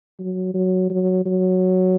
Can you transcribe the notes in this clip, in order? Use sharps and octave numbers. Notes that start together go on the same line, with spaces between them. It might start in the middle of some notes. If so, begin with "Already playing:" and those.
F#3
F#3
F#3
F#3